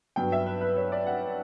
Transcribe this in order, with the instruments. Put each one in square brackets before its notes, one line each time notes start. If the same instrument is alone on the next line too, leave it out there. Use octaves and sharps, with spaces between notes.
[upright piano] G2 F#3 B3 G5
E5
B4
B4
C#5
D5
F#5